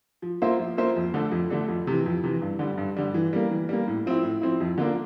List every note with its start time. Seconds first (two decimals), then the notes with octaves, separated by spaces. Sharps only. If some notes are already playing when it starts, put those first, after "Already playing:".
0.22 F3
0.42 A#3 F4 C5 E5
0.59 F3
0.77 A#3 F4 C5 E5
0.96 F2
1.14 D3 A3 D4 A4
1.32 F2
1.50 D3 A3 D4 A4
1.68 F2
1.87 C3 E3
2.06 F2
2.24 C3 E3
2.42 G2
2.59 D3 G3
2.78 G2
2.97 D3 G3
3.14 E3
3.33 G3 A#3
3.51 E3
3.69 G3 A#3
3.88 A2
4.06 F3 C4 E4
4.23 A2
4.41 F3 C4 E4
4.60 F2
4.78 D3 F3 A#3 D4